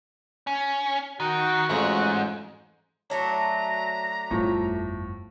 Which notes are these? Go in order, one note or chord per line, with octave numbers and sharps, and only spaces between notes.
C#4
D#3 F#4
A1 F2 G#2 G#3
F#3 A3 D4 C#5 A#5
G1 F2 A2 F3